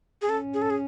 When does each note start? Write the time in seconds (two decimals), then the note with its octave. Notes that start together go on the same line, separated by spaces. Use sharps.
0.22 G#4
0.29 C#4 A4
0.54 G#4
0.62 A4
0.70 G#4